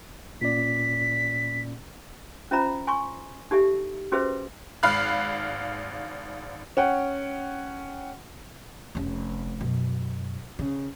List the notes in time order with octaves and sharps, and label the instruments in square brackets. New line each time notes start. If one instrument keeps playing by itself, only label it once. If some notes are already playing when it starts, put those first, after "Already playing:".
[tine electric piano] A#2 C#4 D5 [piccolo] B6
[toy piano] C#4 F4 C5 E5 A#5 B5
G#5 C6 C#6
D#4 G4 A4 E5
C#4 F#4 G#4 B4 C5 E5
[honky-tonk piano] G#1 F5 B5 F6 F#6
[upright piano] C#4 F#5 G5
[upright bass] F1 C#4
F#2 B2
C#3